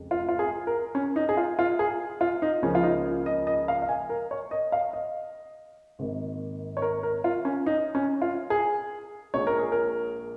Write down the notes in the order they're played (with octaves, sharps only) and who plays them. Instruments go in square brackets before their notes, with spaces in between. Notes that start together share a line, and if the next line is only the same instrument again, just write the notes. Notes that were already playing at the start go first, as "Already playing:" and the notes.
Already playing: [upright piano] F1 F2 C#3 G#3
F4
F4
G#4
A#4
C#4
D#4
G#4
F4
F4
G#4
F4
D#4
C#2 C#3 F3 A#3 C#4
F4
D#4
D#5
D#5
F5
F5
G#5
A#4
C#5
D#5
F5
D#5
G#1 G#2 D#3 A#3
C#5
A#4
A#4
F4
C#4
D#4
C#4
F4
G#4
A#1 A#2 G#3 C#5
A#4
G#4
A#4